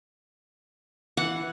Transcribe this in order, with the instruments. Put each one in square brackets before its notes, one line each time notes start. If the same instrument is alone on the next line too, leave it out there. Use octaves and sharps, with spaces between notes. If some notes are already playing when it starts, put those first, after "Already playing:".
[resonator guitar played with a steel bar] E3 [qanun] F#5